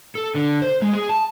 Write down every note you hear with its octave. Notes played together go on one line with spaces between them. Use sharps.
A4
D3
C5
G#3
G#4
A5